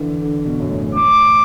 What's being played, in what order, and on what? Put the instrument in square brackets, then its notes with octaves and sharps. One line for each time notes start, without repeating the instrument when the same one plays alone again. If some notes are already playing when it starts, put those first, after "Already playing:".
Already playing: [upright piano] D3 E3
D3
B2
F#2
A2
[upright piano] A2 [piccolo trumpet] D6